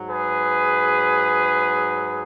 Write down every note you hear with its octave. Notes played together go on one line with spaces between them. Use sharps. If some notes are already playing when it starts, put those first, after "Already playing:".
Already playing: G#2 F#3
G#4 B4